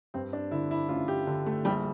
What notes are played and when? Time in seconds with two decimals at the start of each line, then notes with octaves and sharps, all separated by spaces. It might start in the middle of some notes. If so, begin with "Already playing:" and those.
0.14 G2 C4
0.33 D4
0.51 D3 E4
0.71 E4
0.89 A1 F4
1.08 G4
1.27 D3
1.46 A3
1.65 A#1 G3